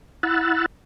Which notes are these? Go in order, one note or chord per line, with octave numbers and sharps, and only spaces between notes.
E4 F#5 B5 E6 F#6 A6